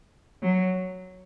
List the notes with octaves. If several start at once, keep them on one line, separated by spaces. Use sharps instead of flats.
F#3